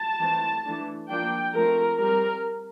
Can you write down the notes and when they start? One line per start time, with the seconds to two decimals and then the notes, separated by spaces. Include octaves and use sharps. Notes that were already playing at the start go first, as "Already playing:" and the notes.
Already playing: A5
0.21 E3 A3 C4
0.65 E3 A3 D4
1.10 F3 A#3 D4 G5
1.54 F3 A3 C4 A#4
1.98 G3 C4 A#4